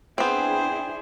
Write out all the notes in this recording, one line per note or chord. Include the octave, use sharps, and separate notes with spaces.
B3 C4 D4 E4 G#4 C5 G5